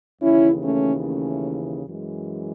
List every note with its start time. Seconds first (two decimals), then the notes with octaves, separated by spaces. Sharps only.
0.21 D#2 C#3 E3 C#4 E4
0.63 A3 C#4
1.04 A3 C#4
1.86 F#2 E3 G#3